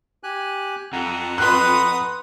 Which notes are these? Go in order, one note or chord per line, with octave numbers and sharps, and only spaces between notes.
G4 G#5 F#6
F2 F#5 A#5
B4 C6 D#6 F#6